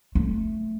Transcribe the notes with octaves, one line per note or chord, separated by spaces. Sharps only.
A3